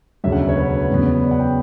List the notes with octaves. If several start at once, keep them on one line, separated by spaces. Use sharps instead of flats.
E1 D2 C#3 F#3 E5
F#5
E5
C#5
B4
E2 C#3 F#3 B3
D5
F#5
G5